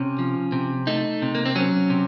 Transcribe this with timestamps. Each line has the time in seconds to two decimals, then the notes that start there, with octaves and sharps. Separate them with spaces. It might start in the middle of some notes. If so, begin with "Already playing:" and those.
Already playing: C3 C#4
0.19 F3
0.52 C3
0.87 A3 D#4
1.22 C3
1.35 A#3
1.46 C4
1.55 F#3 C#4
1.90 C3